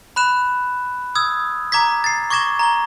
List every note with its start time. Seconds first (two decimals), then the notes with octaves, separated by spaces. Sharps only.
0.16 B5 F#6 E7
1.15 D#6 E6 G#6
1.72 A#5 D6 G#6 B6
2.04 A6 C7
2.30 C#6 D6 G#6 A#6 E7 G7
2.59 A#5 G#6 G7